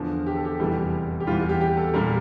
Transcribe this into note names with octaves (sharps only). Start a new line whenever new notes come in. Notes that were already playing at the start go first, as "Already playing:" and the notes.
Already playing: E2 D3 F3
G4
A4
G4
F1 E2 E3 G3 G4
G4
E2 E3 G3 F4
G4
G4
A4
A#2 G3 A#4